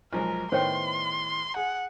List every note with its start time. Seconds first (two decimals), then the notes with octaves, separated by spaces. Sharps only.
0.13 B1 F3 G#3 A#4
0.52 A2 D#3 B3 C5 C#5 G5 C6
1.56 G#4 F#5